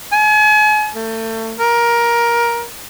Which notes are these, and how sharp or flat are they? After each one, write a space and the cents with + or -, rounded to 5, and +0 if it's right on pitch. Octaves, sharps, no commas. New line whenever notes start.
G#5 +40
A3 +30
A#4 +15